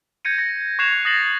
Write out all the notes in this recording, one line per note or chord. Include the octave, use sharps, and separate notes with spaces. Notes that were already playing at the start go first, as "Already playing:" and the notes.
G6 G#6 A#6 C#7 D#7
A#6
C#6 F#6 G#6 C7 E7 F7
D#6 A6 A#6 C7 F#7